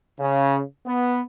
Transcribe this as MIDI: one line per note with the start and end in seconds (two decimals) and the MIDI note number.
0.19 0.61 49
0.86 1.20 59